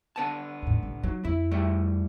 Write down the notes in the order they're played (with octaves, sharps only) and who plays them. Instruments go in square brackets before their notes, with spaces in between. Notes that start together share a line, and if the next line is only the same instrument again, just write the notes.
[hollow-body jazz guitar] D3 B3 A5
[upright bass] D#2 A2
C2 A2
[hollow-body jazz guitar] F#3 [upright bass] D#4 F4
[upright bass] F2 [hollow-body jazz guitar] E4
[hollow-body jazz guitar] G3 A3 E4